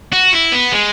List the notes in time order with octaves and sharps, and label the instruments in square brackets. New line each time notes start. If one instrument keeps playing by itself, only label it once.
[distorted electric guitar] F#4
E4
B3
G#3